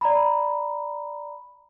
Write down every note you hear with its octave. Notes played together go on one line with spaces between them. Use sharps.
D5 A#5 B5